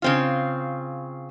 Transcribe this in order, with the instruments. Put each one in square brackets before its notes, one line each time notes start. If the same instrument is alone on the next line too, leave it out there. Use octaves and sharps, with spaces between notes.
[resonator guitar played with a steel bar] C#3 C4 F4